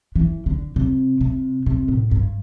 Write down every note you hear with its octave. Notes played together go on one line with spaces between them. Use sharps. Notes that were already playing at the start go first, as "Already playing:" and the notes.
E3
D3
C3
C3
C3
A2
G2